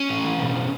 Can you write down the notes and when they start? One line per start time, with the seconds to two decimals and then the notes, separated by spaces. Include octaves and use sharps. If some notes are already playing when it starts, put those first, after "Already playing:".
Already playing: C#4
0.09 A2
0.24 E3
0.39 B2
0.55 B2